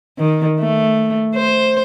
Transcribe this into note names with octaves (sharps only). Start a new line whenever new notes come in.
D#3
A3
C5